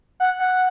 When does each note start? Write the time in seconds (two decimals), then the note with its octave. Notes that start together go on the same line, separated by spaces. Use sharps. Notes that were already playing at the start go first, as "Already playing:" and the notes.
0.20 F#5
0.39 F#5